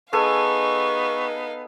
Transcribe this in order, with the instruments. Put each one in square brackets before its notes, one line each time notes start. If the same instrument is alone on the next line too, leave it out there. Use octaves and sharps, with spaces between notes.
[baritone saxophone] B3 [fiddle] D#4 F5 [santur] G#4 A4 G#5 [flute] C#6